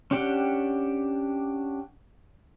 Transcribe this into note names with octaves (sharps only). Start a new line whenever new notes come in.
C#4 D4 G4 F#5 G5